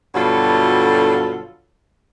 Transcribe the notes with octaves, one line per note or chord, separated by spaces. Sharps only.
G2 B2 D3 F#3 F4 A4